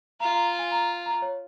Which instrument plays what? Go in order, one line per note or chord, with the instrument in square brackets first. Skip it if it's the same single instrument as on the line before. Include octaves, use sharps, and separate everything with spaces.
[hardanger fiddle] F4 [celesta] A#5
[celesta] A#5
G#5
A#5
A#5
C#5